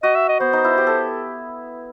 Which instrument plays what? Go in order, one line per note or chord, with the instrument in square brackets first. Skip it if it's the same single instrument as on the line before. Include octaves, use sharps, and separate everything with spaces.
[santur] F#4 [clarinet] D#5
[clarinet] E5
D#5
[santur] B3 [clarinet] C5
[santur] D#4
E4
G4
A4